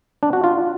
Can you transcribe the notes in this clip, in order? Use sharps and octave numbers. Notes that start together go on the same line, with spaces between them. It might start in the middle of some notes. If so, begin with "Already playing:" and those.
D4
F#4
F4